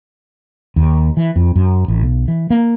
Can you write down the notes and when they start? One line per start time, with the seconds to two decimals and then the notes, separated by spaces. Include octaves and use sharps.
0.76 D#2
1.17 E3
1.36 F2
1.55 F#2
1.88 A1
2.03 B1
2.28 E3
2.50 A#3